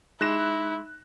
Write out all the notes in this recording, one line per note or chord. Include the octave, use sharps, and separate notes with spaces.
G#3 D#4 E4 C6 D6 F#6 A#6 E7